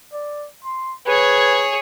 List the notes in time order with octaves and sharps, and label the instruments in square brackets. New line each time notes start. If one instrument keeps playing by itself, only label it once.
[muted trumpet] D5
C6
[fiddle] G#4 C#5 [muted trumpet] B4